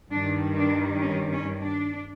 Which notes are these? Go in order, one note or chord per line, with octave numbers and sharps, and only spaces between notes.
G2 D#3 G3 D4
D4
C#4
C#4
D4